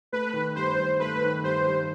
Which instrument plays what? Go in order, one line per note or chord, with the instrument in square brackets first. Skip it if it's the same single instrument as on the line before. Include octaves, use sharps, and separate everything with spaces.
[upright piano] A3 [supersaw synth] B4
[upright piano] D#3
[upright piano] G2 [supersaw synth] C5
[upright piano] G2
[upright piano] A3 [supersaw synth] B4
[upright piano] D#3
[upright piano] G2 [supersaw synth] C5
[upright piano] G2